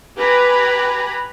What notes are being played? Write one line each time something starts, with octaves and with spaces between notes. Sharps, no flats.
G4 B4 G#5 A#5 B5